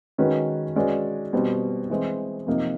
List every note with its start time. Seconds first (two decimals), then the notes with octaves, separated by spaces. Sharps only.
0.18 D#3 G#3 C#4 F#4 B4
0.76 G#3 C#4 F#4 B4 D5
1.33 B2 G3 C4
1.90 E3 G#3 C4
2.47 C3 F3 A#3 D#4